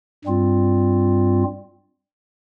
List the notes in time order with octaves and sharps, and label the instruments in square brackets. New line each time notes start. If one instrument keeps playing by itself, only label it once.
[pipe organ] G2 G3 C4 F4